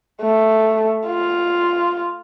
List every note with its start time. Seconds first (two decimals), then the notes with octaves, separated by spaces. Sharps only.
0.22 A3
1.07 F4